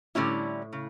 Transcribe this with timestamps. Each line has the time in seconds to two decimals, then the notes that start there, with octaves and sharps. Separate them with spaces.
0.15 A2 D3 G3 C#4 E4
0.73 C#3